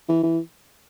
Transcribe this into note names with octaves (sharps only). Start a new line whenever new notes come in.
E3
E3